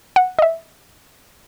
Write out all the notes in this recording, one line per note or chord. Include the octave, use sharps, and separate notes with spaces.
F#5
D#5
E5